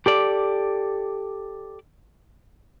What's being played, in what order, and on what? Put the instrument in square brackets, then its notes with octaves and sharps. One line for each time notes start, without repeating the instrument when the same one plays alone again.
[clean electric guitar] G4 A4 D5